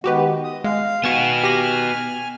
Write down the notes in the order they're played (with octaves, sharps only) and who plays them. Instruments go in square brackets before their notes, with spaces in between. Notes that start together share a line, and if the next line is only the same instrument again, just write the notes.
[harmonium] D#3 G#3 B3 [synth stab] F#4 G4 B4
[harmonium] D#5 [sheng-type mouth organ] D#6
[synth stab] G#3 [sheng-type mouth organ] F5
[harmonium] D#3 [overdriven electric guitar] B3 F#4 [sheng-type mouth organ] G#5 F6 [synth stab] C#6 E7
[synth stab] G4 A#6